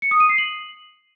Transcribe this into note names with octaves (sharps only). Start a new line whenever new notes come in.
C#7
D#6
D#7
C7
F#7